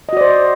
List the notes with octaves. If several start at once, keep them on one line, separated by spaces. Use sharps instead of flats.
F#4 C5 D5 D#5